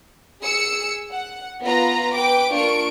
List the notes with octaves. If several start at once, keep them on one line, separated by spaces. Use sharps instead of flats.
G#4 E6 C#7
F#5
B3 F4 B4 A#5 A#6
B4 G5 D6 D7
A#3 D4 F4 C#6 D7